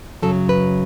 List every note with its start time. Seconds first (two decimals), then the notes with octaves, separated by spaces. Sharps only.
0.22 F#2 C#3 F#3 A4
0.49 B4